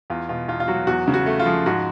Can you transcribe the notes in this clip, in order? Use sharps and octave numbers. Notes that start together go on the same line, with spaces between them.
E2 F4
B2 F4
E2 F4
F4
F#3 F#4
E2 F#4
C#3
F#4
A3
F4
F3
G#2 F#4